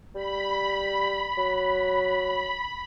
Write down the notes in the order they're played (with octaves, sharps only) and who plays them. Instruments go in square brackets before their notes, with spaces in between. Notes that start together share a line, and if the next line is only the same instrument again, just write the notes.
[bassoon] G3 [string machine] B5
[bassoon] F#3